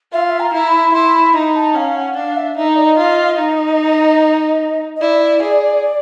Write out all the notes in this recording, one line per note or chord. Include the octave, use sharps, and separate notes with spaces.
F4 E5
F5
E5
A#5
E4
B5
E4 C6
B5
D#4 A#5
A5
C#4 F5
F#5
D4 F5
E5
D#4 E5
D#5
D5
D#5
F4
D#4
D#5
E4 D5
G#4